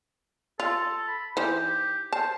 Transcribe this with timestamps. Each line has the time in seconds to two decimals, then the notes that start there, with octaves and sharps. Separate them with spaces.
0.60 F4 A4
1.08 B5
1.37 E3 D#4 G4 C5
2.12 C5 A5